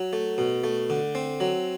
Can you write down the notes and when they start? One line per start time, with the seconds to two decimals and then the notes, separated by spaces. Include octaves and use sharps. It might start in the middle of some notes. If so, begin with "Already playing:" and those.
Already playing: F#3
0.13 A3
0.38 B2
0.64 A3
0.90 D3
1.15 C4
1.40 F#3